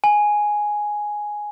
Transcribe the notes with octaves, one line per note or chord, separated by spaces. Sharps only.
G#5